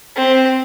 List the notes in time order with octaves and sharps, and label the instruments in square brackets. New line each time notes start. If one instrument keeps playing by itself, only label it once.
[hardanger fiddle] C4